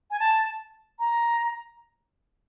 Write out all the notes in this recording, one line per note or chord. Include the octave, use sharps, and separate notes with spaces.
G#5
A5
A#5